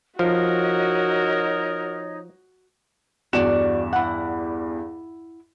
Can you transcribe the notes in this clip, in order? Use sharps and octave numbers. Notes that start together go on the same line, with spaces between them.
F3 D#4 F#4 A#4 C#5 D#5
E2 G2 F#4 D5 E7
E4 F#5